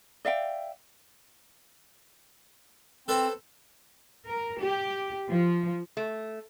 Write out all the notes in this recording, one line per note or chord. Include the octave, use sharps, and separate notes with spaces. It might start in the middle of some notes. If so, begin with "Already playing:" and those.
D5 E5 F5 G5
C4 A4 B4 C5
A#4
G4
F3
A3